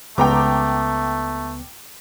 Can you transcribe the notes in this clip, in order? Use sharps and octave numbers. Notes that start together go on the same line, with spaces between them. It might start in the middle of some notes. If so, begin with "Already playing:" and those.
C#2 A3 B3 G5 A#5 D6